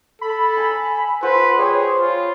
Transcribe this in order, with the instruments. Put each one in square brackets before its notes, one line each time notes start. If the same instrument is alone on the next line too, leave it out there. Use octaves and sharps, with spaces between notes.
[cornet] A4 [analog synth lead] B5
[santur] G#5 A#5
[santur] F3 A4 F#5 [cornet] B4 [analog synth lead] C5
[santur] G3 C#5 C6 [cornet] G#4
[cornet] F4